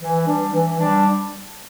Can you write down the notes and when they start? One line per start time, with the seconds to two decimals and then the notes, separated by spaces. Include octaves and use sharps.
0.02 E3
0.27 G3 D4
0.53 E3
0.79 G3 D4